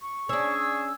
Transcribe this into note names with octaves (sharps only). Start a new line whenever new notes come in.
C#6
C#4 D4 G#4 E6